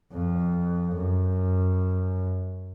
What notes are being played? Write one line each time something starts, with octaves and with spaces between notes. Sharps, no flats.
F2
F#2